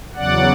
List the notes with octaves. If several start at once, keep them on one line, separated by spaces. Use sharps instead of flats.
E2 C#3 F#3 D5 F#5